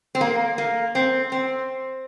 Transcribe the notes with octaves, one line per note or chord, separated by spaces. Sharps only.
C4
A#3
A#3
C4
C4